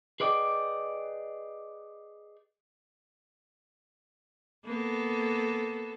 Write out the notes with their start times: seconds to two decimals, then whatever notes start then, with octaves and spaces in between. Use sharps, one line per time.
0.20 G#4 B4 D5 D#5 G5
4.65 A#3 B3 A4